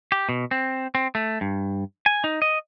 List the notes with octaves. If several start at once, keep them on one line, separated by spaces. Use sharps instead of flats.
G4
B2
C4
C4
A3
G2
G#5
D#4
D#5